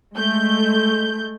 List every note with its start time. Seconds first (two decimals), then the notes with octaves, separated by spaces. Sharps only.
0.16 G#3 A3 G6